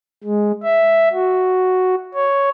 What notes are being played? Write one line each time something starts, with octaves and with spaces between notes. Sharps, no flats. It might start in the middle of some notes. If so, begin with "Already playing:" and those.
G#3
E5
F#4
C#5